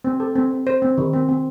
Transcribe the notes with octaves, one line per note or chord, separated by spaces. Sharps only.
C4
A4
C4
C4
C5
C4
D#3
C4
C4